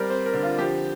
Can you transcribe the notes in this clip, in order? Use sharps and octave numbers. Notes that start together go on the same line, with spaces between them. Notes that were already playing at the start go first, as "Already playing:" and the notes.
Already playing: G3 C4 A#4 D5
C4 C5
A#4
D3
F4
F3 G4